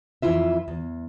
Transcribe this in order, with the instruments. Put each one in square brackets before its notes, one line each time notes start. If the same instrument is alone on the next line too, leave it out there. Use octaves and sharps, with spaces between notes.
[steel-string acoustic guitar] F2 E3 E4 F4 E5
E2